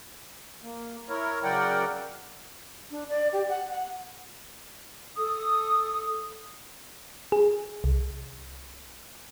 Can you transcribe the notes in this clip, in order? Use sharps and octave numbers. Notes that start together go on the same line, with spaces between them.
A#3
E4 A#4 C#5
C#3 F#3 A#4 D5 F#5 G5
D4
D5
G4
F#5
F#5
A4 D#6
G#4
C2